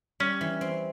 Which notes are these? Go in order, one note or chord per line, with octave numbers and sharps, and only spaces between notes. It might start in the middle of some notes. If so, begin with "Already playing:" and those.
G3 C#4
E3
C4